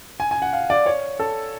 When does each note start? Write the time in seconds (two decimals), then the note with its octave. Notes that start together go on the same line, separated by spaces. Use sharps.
0.20 G#5
0.31 G#5
0.42 F#5
0.53 F5
0.70 D5
0.86 C#5
1.20 A4